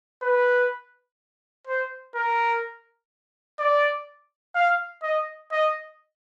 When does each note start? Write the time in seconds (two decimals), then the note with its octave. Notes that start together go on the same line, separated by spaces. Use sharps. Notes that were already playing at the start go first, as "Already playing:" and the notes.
0.22 B4
1.67 C5
2.15 A#4
3.59 D5
4.55 F5
5.02 D#5
5.51 D#5